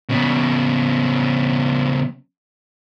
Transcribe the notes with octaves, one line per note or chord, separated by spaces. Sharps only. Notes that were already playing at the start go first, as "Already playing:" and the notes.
C#3 B3